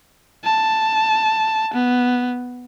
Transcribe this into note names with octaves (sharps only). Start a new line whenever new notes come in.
A5
B3